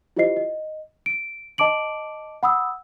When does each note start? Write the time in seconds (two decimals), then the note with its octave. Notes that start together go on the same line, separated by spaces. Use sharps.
0.17 E4 F4 G4 C5 D#5 C7
0.37 D#5
1.06 D7
1.58 D#5 A5 D6 D7 F#7
2.43 F#5 B5 D#6 E6